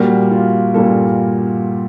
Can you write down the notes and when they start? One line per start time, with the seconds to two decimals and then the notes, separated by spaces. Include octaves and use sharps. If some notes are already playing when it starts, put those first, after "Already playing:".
Already playing: A#2 G3 A#3 F#4
0.31 F4
0.74 A#2 G3 A#3 A4